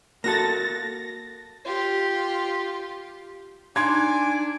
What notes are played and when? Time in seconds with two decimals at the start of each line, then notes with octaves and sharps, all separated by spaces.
0.24 A#3 F#4 A4 A6 A#6
1.65 F4 G4
3.76 D4 D#4 G#5 C6 D6 G#6